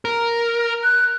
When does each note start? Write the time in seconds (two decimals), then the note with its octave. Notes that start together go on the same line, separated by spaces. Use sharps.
0.05 A#4
0.84 F#6